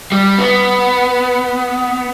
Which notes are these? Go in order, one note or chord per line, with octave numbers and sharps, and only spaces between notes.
G3
B3